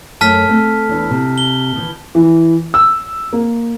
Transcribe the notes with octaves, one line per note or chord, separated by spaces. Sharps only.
F#2 A3 A5 F6 B6
A3 C4
E2 D4
C3
G7
D#3 E3
E3
E6
A#3